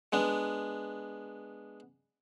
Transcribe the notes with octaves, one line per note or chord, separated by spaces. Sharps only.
G#3 B3 D4